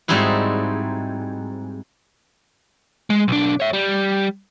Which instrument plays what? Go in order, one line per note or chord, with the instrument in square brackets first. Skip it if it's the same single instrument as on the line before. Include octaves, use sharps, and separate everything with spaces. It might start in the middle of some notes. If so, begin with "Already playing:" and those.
[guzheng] G#2 G3 C4 D#4 E4 F#4
[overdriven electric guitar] G#3
B1 D4
C#5 E5
G3